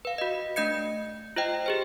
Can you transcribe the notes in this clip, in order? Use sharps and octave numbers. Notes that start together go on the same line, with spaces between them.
B4 F5
F#4 D#5
A3 D4 D#5 G6 G#6 C#7
F4 C5 D#5 G5
G4 G#4 C5